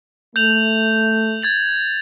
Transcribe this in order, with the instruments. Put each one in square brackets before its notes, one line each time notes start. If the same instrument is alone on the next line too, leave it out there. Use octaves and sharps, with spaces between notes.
[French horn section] A3 [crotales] G6 F7 F#7
[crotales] G#6 A6 F#7